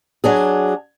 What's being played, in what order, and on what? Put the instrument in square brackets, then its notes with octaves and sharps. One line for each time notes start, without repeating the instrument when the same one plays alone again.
[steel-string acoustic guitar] F#3 D4 G#4